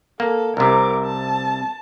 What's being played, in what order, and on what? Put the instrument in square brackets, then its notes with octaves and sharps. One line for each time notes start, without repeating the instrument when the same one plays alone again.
[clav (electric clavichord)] A#3 [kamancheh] A4
[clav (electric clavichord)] C2 C3 [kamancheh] A#4 D6
[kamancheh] A5